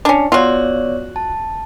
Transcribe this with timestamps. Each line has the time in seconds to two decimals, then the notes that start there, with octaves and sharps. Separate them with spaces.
0.05 C#4 D4
0.32 B3 F4 F#4 C#5 D5
1.16 A5